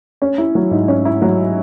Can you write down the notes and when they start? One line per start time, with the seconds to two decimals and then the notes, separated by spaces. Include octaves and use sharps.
0.22 C#4
0.38 E4
0.55 F#3
0.71 G#2
0.88 C#4
1.05 E4
1.22 F#3